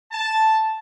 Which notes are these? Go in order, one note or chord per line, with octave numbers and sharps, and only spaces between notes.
A5